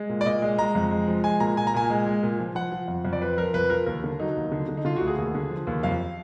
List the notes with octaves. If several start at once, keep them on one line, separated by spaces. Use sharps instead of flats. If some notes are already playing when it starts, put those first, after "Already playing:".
Already playing: G#3
A#2
D5
A#2 D#5
G#3
G#3 A#5
F2
G#3
F3
G#3 G#5
A#2 A#5
A#2 G#5
A#5
A#2 G#5
G#3
G#3
A#2
F3
F3 F#5
F3
F2
F2
D5
F3 B4
F3 A#4
F2 B4
F3 A#4
D#2 A#4
D3
F#3 D#4
D#2
D3
D3
D#4
D3 F4
D2 F#4
G#4
D#2
D3
F3
D#2
F2 F5